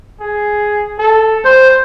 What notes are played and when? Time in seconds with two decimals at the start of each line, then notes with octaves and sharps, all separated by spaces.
0.20 G#4
0.99 A4
1.45 G3 C5